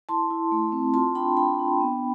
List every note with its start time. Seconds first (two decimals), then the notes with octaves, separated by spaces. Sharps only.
0.09 E4 A5 C6
0.31 E4
0.52 A3
0.72 C4
0.94 F4 A5 C6
1.15 D4 G5 B5
1.37 D4 G5 B5
1.59 D4
1.80 B3